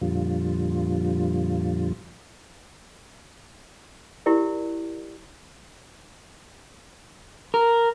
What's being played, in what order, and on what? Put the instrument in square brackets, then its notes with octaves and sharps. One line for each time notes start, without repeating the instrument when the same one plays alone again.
[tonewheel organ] F2 A#2 D3 F3 G3 F4
[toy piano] E4 G4 A#4 D5
[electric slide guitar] A#4